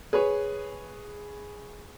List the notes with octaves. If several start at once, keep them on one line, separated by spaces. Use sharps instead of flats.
G#4 B4 C#5